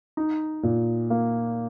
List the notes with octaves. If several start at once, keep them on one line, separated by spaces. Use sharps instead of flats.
D#4
A#2
A#3